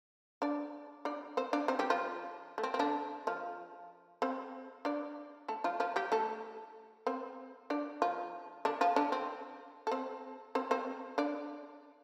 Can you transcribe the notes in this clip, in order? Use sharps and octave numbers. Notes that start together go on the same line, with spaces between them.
D4 D5
D4 D5
C4 C5
D4 D5
C4 C5
G3 G4
F3 F4
A3
C4
C4
D3 D4
F3 F4
C4 C5
D4 D5
A3 A4
F3 F4
F3 F4
G3 G4
A3 A4
C4 C5
D4 D5
F3 F4
D3 D4
F3 F4
D3 D4
C4
A4
C4 C5
C4 C5
C4 C5
D4 D5